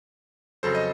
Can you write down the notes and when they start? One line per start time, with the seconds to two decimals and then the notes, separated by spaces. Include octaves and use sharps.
0.63 F2 C#3 F#3 A4 C5
0.75 D#5